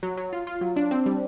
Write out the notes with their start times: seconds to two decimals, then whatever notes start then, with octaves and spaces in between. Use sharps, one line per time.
0.03 F#3
0.17 F#3
0.33 F4
0.47 F4
0.61 F#3
0.76 D4
0.91 C4
1.06 G3